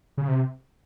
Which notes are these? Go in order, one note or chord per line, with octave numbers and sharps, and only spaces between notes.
C#3
C3